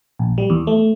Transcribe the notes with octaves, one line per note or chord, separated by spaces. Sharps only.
A#1
G3
E2
A3